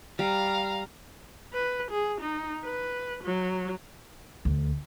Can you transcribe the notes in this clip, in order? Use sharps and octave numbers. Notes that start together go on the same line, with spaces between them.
G3 F5 A#5
B4
G#4
D#4
B4
F#3
D2